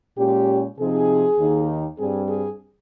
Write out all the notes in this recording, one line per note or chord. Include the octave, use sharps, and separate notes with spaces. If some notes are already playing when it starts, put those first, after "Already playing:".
A#2 G#3 C#4 G4
C3 F3 C4 D#4 G#4
D#2 D#3 A#3 D#4
G2 G3 C4 G#4
G#4